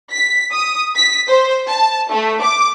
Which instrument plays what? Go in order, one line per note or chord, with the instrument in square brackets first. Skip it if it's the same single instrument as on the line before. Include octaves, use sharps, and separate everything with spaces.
[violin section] B6
D#6
B6
C5
A5
A3
D6